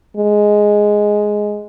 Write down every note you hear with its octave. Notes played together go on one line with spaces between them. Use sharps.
G#3